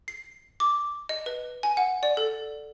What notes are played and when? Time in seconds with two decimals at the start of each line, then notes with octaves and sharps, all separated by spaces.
0.08 C7
0.60 D6
1.09 D#5
1.26 B4
1.63 G#5
1.77 F#5
2.03 D5
2.17 A4